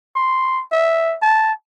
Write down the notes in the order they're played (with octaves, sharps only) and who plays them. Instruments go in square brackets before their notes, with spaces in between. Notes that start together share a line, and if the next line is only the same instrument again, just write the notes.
[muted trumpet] C6
E5
A5